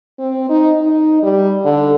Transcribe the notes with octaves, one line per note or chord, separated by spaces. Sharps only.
C4
D#4
D#4
G3
D3